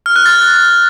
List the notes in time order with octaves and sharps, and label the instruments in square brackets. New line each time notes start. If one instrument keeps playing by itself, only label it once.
[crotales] F6
F#6
A6